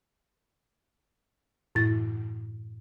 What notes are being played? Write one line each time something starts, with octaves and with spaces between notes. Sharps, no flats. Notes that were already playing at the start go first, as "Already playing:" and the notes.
F#2 A2 E3 E4 A6